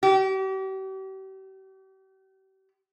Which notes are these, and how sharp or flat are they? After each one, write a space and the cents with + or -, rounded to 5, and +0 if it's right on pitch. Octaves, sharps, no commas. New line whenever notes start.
G4 -40